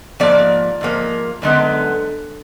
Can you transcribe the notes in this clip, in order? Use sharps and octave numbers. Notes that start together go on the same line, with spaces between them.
G#2 F3 A#3 D5
G#2 F3 A#3
F#2 D3 G#3 B3